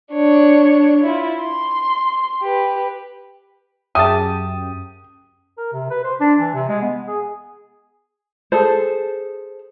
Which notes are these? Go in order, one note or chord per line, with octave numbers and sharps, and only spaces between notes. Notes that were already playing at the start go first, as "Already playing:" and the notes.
D4 C#5
E4 F4
C6
G4 B4
F#2 G4 G#4 E5 G#5 A5 D#6
A#4
C3
B4
C5
D4
E3
C3
G#3
B3
G#4
G#4 A4 C5